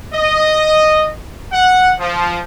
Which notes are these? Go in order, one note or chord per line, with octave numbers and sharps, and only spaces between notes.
D#5
F#5
F3